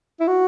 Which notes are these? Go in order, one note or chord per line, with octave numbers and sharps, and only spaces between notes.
E4
F#4